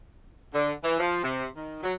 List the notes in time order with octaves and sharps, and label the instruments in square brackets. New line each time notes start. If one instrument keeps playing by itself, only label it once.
[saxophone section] D3
E3
F3
C3
D#3
F#3